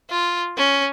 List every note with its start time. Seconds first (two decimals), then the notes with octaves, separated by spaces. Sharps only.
0.11 F4
0.57 C#4